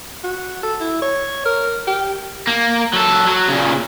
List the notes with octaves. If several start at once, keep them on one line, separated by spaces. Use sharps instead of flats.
F#4
A4
E4
C#5
A#4
G4
A#3
F#3 A4
F#3
A#2 C#3